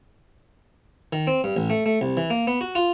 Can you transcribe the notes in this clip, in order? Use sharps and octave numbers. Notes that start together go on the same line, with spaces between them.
D#3
C4
G2
A1
A3
A3
C2
E3
A#3
B3
F#4
F4